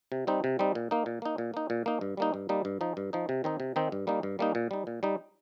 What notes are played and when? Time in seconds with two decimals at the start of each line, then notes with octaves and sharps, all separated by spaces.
0.12 C3
0.27 G3 C4 D#4
0.44 C3
0.59 G3 C4 D#4
0.75 A#2
0.91 A#3 D#4
1.06 A#2
1.22 A#3 D#4
1.38 A#2
1.54 A#3 D#4
1.70 A#2
1.86 A#3 D#4
2.01 G2
2.17 G3 A#3 D#4
2.34 G2
2.49 G3 A#3 D#4
2.65 G2
2.81 F3 D#4
2.97 G2
3.13 F3 D#4
3.29 C3
3.44 D#3 C4 D#4
3.60 C3
3.76 D#3 C4 D#4
3.92 G2
4.07 G3 A#3 D#4
4.23 G2
4.39 G3 A#3 D#4
4.55 A#2
4.71 G3 D#4
4.87 A#2
5.03 G3 D#4